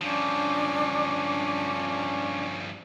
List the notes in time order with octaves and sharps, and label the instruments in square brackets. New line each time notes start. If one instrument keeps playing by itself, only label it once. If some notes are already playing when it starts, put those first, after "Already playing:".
[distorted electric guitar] G2 F3 [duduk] C#4 [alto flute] D4